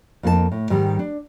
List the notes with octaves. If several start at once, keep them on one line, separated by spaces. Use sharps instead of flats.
F2 A#3 D#4 A4 A5
A2
G#2 D#3 G3
D4